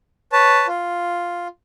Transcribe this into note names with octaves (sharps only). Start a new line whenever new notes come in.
B4 C#5 A5
F4